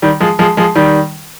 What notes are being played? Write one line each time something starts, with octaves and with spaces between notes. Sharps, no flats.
D#3 G3
F3 G#3
F3 G#3
F3 G#3
D#3 G3